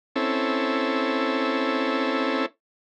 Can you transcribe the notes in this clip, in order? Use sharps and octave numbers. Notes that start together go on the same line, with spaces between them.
C4 C#4 E4 A4